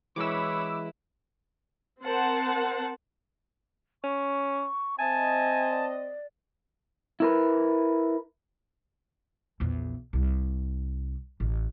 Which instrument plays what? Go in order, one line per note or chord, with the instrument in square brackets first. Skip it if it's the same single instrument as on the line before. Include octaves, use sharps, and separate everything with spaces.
[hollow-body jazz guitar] E3 G#3 [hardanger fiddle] E4 B4 [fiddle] C#5 B5 [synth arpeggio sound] D6 E6
[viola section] C4 A#4 C5 F#5 A5
[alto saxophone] C#4 [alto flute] C#6
[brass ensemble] C4 D#5 [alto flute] E5 [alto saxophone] G#5 [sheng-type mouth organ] A5
[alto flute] D5
[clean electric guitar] E4 A#4 B4
[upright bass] A#1 E2
C2
A1